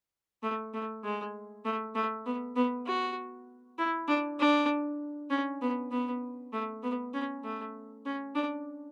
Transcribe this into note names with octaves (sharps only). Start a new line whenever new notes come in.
A3
A3
G#3
A3
A3
B3
B3
F#4
E4
D4
D4
C#4
B3
B3
A3
B3
C#4
A3
C#4
D4